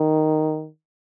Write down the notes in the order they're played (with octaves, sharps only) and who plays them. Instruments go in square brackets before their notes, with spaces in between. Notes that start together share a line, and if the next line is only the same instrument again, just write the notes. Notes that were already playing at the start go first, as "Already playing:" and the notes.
Already playing: [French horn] D#3